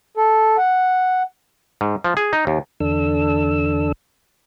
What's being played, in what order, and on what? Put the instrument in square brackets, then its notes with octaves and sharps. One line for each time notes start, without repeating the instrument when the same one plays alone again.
[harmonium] A4
F#5
[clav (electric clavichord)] G#2
F3
G#4
D#4
D#2
[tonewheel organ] E2 D3 D4 A4 E6